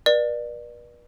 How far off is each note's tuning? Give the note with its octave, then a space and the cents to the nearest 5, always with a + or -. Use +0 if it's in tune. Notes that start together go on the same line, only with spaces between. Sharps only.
B4 -45 D5 +30